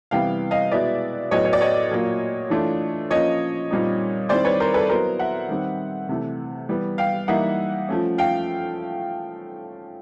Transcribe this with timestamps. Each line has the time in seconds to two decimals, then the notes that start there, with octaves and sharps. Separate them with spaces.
0.11 C3 E3 G3 B3 E4 F5 G5
0.51 D#5 F5
0.71 B2 G#3 B3 E4 D5 E5
1.31 A2 F#3 B3 C#5 D#5
1.45 C#5
1.53 D5
1.61 C#5 D#5
1.91 A#2 F#3 A#3
2.50 E3 A3 D4 F4
3.11 F3 A#3 C#4 C#5 D#5
3.71 A#2 G3 C4 D#4
4.29 D#3 G3 C4 E4 C5 D5
4.45 B4 C#5
4.60 A#4 C5
4.74 A4 B4
4.89 F#3 B3 E4 A#4 C5
5.19 E5 F#5
5.49 D#3 G3 C4
6.09 C3 E3 A3
6.69 E3 G3 B3
6.98 F5 G5
7.28 E3 G3 A#3 D#4 E5 F#5
7.89 F3 A3 C#4
8.18 F5 G5